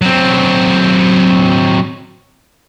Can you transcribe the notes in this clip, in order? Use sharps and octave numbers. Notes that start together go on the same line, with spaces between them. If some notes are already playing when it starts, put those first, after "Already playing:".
F#3 C4